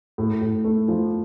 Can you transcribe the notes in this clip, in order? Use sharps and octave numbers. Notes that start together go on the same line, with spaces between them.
A2
A2
A3
F3